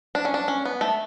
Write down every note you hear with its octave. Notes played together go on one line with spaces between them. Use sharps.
D4
C#4
D4
C#4
B3
A3